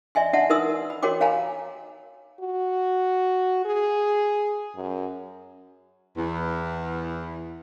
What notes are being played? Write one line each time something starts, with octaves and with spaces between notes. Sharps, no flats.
D5 E5 G#5 C6
D4 D5 E5 F#5 A5 C6
D#4 A#4 B4 C6 D#6 E6
B5
F#4 A#4 C#5 G5 C6 D6
C#5 F5 G#5 A#5 B5
F#4
G#4
F#2
E2